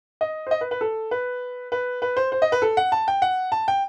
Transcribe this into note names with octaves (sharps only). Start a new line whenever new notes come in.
D#5
C5
D#5
B4
B4
A4
B4
B4
B4
C5
C5
D#5
B4
A4
F#5
A5
G5
F#5
A5
G5